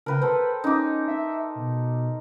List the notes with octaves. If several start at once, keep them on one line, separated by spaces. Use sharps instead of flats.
C#3 A#4 B4 G5
A4 B4 C5
C#4 D#4 D6
E5
B2